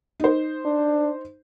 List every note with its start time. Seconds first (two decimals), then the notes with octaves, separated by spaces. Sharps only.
0.20 D#4 C5
0.65 D4